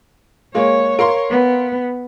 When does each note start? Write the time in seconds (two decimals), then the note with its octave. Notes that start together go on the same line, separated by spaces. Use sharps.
0.54 G#3 A#3 C#5
0.99 A#4 F5 C6
1.31 B3